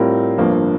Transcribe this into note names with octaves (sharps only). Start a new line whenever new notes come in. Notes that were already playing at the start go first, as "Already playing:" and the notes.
Already playing: A2 G3 C4 F4 A#4
G1 G2 F3 A#3